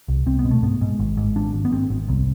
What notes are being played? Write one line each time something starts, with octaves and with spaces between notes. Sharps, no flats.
C2
C2 C4
B3
B2
A3
G#2 B3
G#2
G#1
G#2
G#1 D4
G#1
B3
G#1 C4
G#1
C2